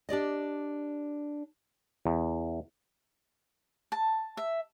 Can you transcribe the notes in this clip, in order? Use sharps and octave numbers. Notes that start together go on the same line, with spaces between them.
D4 G4 D5 D#5
E2
A5
E5